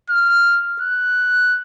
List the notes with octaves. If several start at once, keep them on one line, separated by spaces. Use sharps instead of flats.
F6
F#6